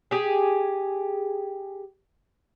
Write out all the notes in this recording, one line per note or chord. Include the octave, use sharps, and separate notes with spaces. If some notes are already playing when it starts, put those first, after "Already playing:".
G4 G#4